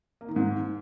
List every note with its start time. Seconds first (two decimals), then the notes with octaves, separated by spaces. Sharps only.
0.21 A#3
0.28 D#3
0.36 G#2